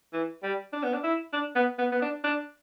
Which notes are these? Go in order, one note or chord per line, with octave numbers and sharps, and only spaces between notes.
E3
G3
D4
B3
D4
E4
D4
B3
B3
B3
D4
D4